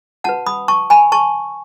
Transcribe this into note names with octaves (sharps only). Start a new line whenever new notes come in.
C#4 F#4 B4 F#5 A5
B5 D#6
A5 C#6
G#5 B5
A5 C#6